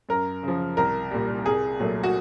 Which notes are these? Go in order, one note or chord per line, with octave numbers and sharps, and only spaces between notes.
F#2 A#4
C#3 F3
C2 A#4
A#2 G3
C2 G#4
A#2 F#3 A3
F#4